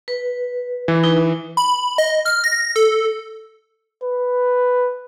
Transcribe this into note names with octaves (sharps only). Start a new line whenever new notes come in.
B4
E3
D#4 B4
B5
D#5
F6
A#6
A4
B4